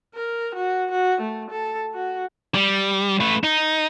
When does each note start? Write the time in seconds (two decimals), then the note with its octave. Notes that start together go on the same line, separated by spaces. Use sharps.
0.15 A#4
0.55 F#4
0.91 F#4
1.21 A3
1.51 A4
1.94 F#4
2.55 G3
3.20 A3 B4
3.44 D#4